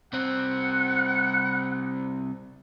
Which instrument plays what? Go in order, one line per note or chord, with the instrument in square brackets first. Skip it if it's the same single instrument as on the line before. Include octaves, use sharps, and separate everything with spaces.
[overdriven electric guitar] C2 C4 [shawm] F#5